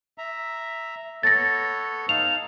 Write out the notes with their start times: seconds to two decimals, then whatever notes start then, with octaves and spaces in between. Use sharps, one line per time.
0.18 E5 A#5
1.23 B3 A4 C#5 A6 A#6
2.09 D#4 F5 A5 F7